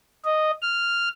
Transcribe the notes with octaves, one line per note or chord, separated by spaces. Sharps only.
D#5
F6